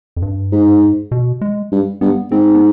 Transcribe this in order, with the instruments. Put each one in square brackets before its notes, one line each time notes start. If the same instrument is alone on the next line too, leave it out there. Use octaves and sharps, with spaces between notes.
[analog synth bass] F2
G2
[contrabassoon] G#2
[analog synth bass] B2
G#3
[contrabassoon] G2
[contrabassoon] G2 [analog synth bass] B3
[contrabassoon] G#2 [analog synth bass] C4
[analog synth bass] B3